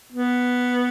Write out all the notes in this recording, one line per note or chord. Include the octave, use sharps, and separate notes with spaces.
B3